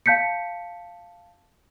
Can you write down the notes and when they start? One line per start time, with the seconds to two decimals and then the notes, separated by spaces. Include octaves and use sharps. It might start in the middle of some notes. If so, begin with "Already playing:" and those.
0.06 F5 A5 G6 B6 C#7